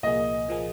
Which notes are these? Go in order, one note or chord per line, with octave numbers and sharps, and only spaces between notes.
C2 A#2 F3 A#3 G#4 D#5
A#2 F3 A#3 G#4